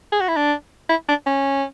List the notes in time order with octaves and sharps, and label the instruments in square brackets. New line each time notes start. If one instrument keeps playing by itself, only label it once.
[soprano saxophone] G#4
F#4
E4
D4
E4
D4
C#4